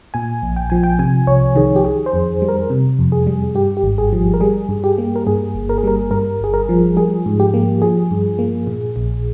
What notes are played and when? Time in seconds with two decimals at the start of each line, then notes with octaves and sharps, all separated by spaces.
0.14 A#2 G#5
0.43 A#1
0.56 G5
0.70 F3 G#5
0.83 G5
0.99 C3 G#5
1.27 C2 C#5
1.56 D#3 G#4
1.76 G4
1.84 D#3 G#4
2.06 C5
2.13 F2
2.42 G3
2.49 A#4
2.70 C3
2.99 F2
3.12 G#4
3.27 G3
3.55 G2 G4
3.77 G4
3.83 G#1
3.98 G#4
4.13 F3
4.34 A#4
4.40 G3 G#4
4.69 G2
4.84 G4
4.98 A#3
5.16 A#4
5.27 G2 G#4
5.55 G1
5.69 A#4
5.78 G#4
5.84 G3 A#4
6.11 G2 A#4
6.41 G1 G#4
6.54 A#4
6.69 F3
6.97 G3 G#4
7.26 G#2
7.40 G4
7.54 A#3
7.82 F3 G#4
8.11 G2
8.39 A#3
8.67 A#2
8.96 A#1